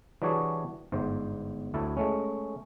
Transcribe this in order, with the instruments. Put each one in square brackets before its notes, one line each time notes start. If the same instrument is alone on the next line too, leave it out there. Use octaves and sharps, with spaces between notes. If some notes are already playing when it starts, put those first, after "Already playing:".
[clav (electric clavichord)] E3 G3 D4 F#4 G#4 C#5
G1 G#2 C5
D2 E4 A4
G#3 A3 C#4